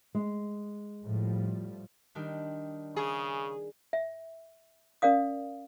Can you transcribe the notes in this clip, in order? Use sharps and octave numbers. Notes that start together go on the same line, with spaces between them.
G#3
A2 F3 G3
D#3 G3 D4
C#3 G#4
E5
C#4 A#4 D5 F5 D#6